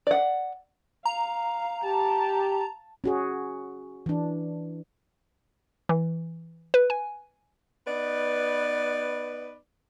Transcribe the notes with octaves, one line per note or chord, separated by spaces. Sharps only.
D5 F#5
F5 A#5
G4 A5
C#4 F#4 G#4
E3 D4
E3
B4
G#5
B3 D#4 B4 D5